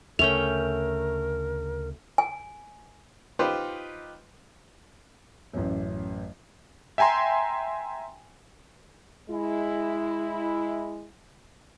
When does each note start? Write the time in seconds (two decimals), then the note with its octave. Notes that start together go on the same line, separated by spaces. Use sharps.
0.19 D2 C#3 A3 C#4 A#4 G5 F7
2.18 G#5
3.39 D#4 F4 G4 B4 C5
5.53 A1 F#2
6.98 E5 G5 G#5 A#5 C6
9.29 G#3 E4